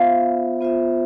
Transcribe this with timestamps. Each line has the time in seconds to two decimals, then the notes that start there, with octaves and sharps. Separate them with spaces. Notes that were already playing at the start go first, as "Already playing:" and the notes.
Already playing: B3 F4 C5 E5 F5
0.60 B3 F4 C5 E5